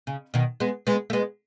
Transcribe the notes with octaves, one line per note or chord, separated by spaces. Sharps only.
C#3
B2 D#3
G#3 B3
G#3 B3
A3
G#3 B3